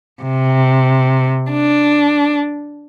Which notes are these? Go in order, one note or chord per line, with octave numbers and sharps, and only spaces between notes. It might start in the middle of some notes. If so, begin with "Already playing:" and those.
C3
D4